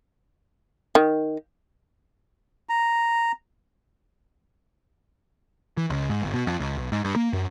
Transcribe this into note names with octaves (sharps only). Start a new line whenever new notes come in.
D#3
A#5
E3
C#2
G#2
G1
B2
F2
C#2
B1
G#2
G2
A#3
F#2